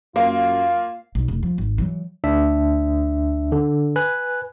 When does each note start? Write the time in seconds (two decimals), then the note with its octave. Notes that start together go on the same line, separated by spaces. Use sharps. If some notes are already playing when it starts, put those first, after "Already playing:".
0.16 F#2 A#3 F4 F5
1.15 B1
1.28 F1
1.43 F3
1.58 G#1
1.78 E3 F#3
2.24 D2 D4 E5
3.52 D3
3.96 B4 G#5 F#6